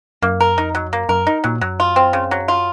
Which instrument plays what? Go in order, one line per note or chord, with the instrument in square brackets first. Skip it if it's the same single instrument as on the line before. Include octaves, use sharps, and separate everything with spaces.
[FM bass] F#2 [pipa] A#3
[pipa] A#4
[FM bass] F2 [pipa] D#4
[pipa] F#3
[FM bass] F#2 [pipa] A#3
[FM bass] F#2 [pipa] A#4
[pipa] D#4
[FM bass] A#2 [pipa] F#3
[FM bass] F#2 [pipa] F#3
[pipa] F4
C4
C#3
F#3
F4